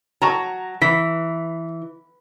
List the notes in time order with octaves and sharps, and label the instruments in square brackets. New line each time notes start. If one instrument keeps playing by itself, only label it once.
[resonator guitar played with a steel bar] F#3 [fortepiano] A5 A#5 C#6
[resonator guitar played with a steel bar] E3 [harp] B6